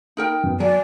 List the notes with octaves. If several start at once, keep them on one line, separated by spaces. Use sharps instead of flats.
D#4 A#4 G5
F#2 B3
F#3 D5 G#5